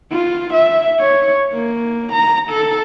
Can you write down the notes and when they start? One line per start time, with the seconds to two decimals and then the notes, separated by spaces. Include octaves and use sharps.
0.12 F4
0.54 E5
0.99 C#5
1.52 A#3
2.12 A#5
2.50 A4